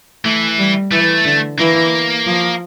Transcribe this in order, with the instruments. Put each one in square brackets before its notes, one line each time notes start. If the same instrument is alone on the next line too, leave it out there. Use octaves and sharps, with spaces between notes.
[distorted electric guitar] E3 [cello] A3
[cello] G3
[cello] E3 [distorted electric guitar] A3
[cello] D3
[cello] E3 [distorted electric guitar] A#3
[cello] F3